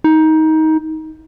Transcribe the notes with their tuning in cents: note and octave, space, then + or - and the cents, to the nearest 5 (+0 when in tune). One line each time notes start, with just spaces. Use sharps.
D#4 +20